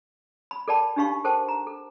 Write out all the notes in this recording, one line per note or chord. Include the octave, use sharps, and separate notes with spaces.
B5
A4 A#4 D5 G5 A5 B5
D4 D#4 G4 F5 B5 C#6
A4 A#4 C5 G5 A5
A#5
A4